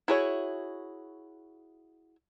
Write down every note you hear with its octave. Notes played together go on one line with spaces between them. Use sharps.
E4 F#4 G#4 C5 C#5